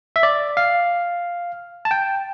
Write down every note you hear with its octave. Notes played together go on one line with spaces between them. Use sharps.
E5
D5
F5
A5
G5